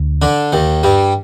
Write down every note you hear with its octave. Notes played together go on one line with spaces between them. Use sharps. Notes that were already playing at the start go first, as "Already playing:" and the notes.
Already playing: D2
D3 D4
D#2 D#3
G2 G3